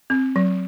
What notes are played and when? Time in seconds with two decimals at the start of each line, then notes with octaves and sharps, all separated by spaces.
0.10 C4
0.36 F#3